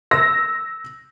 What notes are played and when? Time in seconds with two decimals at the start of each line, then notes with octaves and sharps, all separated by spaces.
0.11 E6 A#6